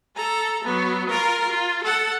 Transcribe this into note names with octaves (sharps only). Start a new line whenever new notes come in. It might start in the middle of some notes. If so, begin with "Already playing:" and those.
A4 A#5
F#3 B3
F4 A#4
F4
A4 F#5